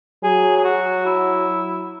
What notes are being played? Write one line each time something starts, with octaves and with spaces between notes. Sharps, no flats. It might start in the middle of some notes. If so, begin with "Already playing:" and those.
F#3 G#4
G#4
F#4
E4